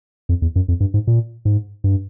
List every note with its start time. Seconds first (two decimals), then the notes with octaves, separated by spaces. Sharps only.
0.29 F2
0.42 E2
0.56 F#2
0.68 F2
0.80 G2
0.94 G#2
1.07 A#2
1.45 G#2
1.84 G2